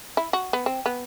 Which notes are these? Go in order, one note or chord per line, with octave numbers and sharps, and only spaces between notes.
E4
F#4
B3
C4
B3